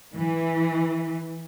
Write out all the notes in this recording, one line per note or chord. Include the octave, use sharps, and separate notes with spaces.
E3